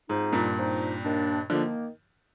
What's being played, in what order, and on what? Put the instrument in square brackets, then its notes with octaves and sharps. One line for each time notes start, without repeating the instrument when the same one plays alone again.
[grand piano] G#2 [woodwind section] F3 C4 D#4
[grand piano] G2 A#2
[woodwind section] F3 C4 D#4
D#2 D#3 A#3 D4
[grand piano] D3 F3 [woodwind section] D#3 A#3